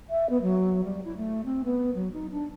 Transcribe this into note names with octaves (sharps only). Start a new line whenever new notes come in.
E5
B3
F#3
G3
E4
A3
C4
B3
F#3
D#4
D4